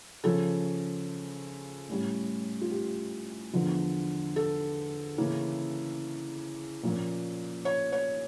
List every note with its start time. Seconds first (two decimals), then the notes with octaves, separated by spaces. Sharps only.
0.23 C#3 F3 C#4 A4
1.89 A2 G3 C#4
2.61 F4
2.71 G4
3.53 E2 D3 F3
4.36 A4
5.18 C#3 E3 A#3 C#4
6.83 A#2 F3 A#3 C#4
7.65 C#5
7.93 C#5